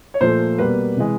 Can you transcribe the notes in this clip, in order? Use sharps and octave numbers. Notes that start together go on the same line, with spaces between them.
C#5
A#2 F3 A3 C5
B2 G3 A#3 B4
C3 E3 G#3